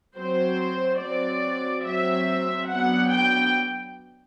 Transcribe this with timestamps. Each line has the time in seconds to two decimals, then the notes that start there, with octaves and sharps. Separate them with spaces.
0.16 F#3 C4 C5
1.00 F#3 C4 D5
1.85 F#3 C4 E5
2.69 F#3 B3 D4 F#5
3.12 G5